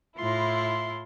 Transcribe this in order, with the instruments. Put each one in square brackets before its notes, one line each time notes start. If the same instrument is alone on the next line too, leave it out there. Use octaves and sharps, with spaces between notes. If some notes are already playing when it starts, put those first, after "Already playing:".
[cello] A2 F4 [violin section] E4 [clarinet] C6